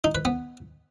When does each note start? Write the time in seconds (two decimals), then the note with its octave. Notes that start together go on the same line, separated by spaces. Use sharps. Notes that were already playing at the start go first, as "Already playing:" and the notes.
0.04 D#4
0.15 B4
0.25 B3